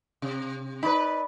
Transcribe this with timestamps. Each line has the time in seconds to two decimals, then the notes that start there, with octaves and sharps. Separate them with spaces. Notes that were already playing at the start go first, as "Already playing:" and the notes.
0.22 C3
0.83 D#4 B4 D5 B5